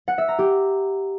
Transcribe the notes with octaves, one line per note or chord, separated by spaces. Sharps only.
F#5
E5
A#5
G4